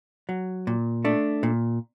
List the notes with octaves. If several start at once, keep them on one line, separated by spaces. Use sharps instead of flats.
F#3
A#2
A3 D4
A#2